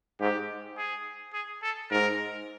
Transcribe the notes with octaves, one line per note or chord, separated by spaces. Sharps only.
G#2 G4
G#4
G#4
A4
G#2 A#4